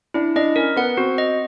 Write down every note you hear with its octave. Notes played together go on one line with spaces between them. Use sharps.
D4 E4
D4 D#5
C#4 A#4
B3 F#5
C4 F#4
D#5